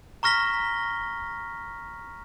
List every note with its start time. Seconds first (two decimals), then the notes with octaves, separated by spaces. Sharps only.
0.23 A#5 C#6 F6 A#6 B6 G7